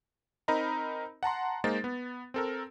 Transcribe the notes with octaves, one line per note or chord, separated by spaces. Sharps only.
C4 D#4 A#4 D#5 A#5 B5
F#5 A5 A#5 C6
G#3 A#3 D#4 C5 A6
B3
C4 A4 A#4